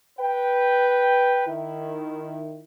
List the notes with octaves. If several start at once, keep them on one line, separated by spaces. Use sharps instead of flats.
B4 G5
D#3 E4